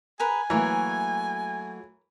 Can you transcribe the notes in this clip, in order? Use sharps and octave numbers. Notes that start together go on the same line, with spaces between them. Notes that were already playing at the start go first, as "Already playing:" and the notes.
G#4 A#4 B4 G#5
E3 F#3 A3 A#3 A#4 C#5